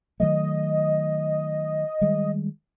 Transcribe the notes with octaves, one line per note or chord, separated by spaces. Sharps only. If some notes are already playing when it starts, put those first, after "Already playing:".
D#3 F#3 A3 D#5
D#3 G3 G#3